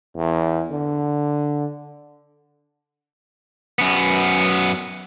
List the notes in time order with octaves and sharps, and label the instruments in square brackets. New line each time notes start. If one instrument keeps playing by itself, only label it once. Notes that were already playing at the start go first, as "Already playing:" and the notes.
[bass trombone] E2
D3
[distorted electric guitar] F#2 B3